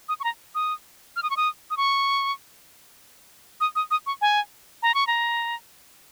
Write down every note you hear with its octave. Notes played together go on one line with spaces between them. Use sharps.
D#6
C#6
A#5
D#6
F6
D#6
C#6
D#6
D#6
C#6
D#6
D#6
D#6
C#6
G#5
A#5
C#6
A#5